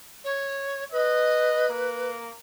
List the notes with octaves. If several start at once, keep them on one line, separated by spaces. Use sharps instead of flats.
C#5
B4 D#5
A#3